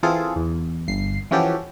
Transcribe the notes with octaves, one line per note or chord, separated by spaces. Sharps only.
E3 C4 F4 G#4 A4
E2
G1 C7
E3 F3 C#4 F#4 G4 A4